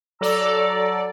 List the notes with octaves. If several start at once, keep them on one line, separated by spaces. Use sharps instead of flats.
F#3 A4 D5 A#5 E6